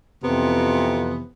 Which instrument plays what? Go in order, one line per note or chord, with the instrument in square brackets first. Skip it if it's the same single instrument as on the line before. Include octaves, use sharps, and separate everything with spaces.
[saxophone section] F2 C3 E3 B3